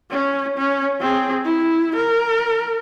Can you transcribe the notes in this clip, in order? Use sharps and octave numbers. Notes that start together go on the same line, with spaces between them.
C#4
C#4
C4 G#4
E4
A#4